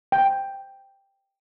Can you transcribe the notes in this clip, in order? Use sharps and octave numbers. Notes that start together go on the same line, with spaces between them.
G5